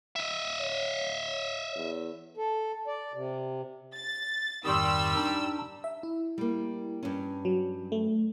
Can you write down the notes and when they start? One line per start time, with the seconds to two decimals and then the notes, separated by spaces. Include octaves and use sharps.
0.16 D#5 E5
0.61 C#5
1.76 E2
2.37 A4
2.87 D5
3.14 C3
3.94 A6
4.65 F2 G#2 D#3 G3 C6 C#6 D#6 E6
5.16 D4 D#4
5.84 E5
6.03 E4
6.38 G3 A#3
7.03 G2 C#4
7.45 F#3
7.92 A3